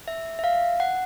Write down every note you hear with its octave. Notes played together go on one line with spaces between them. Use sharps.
E5
E5
F5
F#5